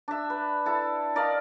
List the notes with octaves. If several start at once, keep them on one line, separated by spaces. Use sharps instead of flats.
D4 E5
B4
E4 A4
A#4 D5 D#5 F5